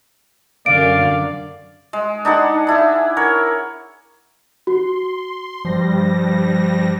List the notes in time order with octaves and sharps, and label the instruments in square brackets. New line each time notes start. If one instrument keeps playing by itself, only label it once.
[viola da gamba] F#2 D3 [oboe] D5 [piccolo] F5 [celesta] D7
[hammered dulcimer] G#3
D4 D#4 G#4 F#5
D4 E4 G#4
A#4 C#5 F#5
[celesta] F#4 [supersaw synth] C6
[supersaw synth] G2 G3 A#6 [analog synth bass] F3